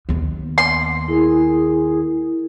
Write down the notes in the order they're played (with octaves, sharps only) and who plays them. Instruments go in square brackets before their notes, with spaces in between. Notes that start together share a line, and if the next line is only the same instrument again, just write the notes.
[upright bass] D#2 B3
[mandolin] C6
[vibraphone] E4 A#4 [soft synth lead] G#4